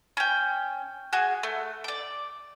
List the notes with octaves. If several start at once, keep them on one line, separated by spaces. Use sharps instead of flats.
C#4 G5
F#4 G#4
A3
D5 D6